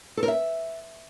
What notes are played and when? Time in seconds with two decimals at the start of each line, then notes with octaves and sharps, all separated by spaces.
0.17 A4
0.23 A#4
0.28 E5